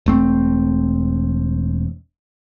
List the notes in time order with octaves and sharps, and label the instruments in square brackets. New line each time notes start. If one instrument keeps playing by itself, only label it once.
[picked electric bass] E1 A3 C4